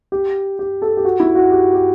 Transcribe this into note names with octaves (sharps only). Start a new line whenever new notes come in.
G4
G4
A4
G4
F#4
E4
F#4
G4
G4